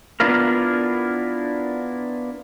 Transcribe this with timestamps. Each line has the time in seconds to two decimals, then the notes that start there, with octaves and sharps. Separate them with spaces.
0.20 B3 D4 E4 F4 A#4